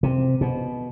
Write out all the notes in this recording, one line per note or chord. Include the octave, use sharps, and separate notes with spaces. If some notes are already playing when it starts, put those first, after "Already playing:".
C3
B2